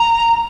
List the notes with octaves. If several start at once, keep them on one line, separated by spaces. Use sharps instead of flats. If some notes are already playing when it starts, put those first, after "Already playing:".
Already playing: A#5